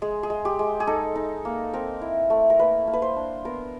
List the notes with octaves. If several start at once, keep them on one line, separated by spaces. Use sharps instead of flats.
G#3 G#4
G#4
G#3
G4
G#3
G#4
D#4 A4
D#4
A#3
C4 A#4
E4
A3
A#4
A#3 B4
A#3
B4
C5
D4
B3 A#4